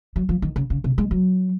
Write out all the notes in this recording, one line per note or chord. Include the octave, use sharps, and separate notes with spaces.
F#3
F3
D#3
C#3
C#3
C3
G#3
F#3